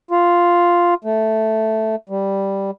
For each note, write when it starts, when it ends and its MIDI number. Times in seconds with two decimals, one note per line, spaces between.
0.11 0.94 65
1.04 1.96 57
2.09 2.71 55